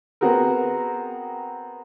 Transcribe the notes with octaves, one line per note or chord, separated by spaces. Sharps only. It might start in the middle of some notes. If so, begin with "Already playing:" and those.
B3 C4 F#4 G#4 A#4